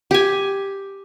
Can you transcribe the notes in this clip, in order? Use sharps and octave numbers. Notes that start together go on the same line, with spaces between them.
G4 G#5